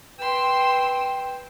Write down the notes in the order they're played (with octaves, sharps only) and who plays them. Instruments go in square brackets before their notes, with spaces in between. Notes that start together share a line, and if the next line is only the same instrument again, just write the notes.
[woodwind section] B4 G5 [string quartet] C6 E6